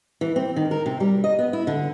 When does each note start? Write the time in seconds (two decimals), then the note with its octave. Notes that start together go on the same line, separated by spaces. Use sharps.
0.21 E3
0.36 C4
0.56 D#3
0.71 A#4
0.86 C3
1.00 G3
1.24 D#5
1.39 B3
1.53 E4
1.67 D3